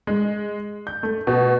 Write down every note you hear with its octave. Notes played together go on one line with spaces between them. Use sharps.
G#3
G6
A3
B2